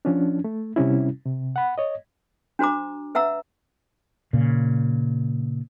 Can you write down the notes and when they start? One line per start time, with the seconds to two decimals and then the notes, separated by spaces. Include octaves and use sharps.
0.05 F3 C#4 D4
0.44 A3
0.76 C3 G3 C#4 E4
1.25 C3
1.56 F#5 B5
1.78 C#5 D#5
2.59 D4 F#4 C5 A#5 D6
3.15 B4 E5 F#5 A#5 E6
4.33 A#2 C#3